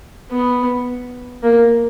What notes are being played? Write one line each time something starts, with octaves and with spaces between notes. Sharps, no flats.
B3
A#3